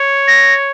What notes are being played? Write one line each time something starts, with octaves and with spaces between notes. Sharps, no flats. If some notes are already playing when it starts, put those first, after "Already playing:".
Already playing: C#5
A#6